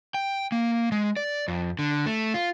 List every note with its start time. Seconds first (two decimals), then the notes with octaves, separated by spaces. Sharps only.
0.14 G5
0.52 A#3
0.92 G#3
1.17 D5
1.48 F2
1.79 D3
2.06 A3
2.34 F4